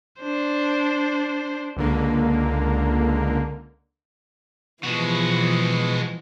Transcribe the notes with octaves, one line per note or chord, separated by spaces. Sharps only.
D4 C5
C#2 D3 A#3
B2 E3 F3 G#3 F#4